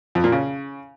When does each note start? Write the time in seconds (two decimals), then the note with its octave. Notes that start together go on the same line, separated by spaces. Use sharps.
0.15 F2
0.24 A#2
0.32 C#3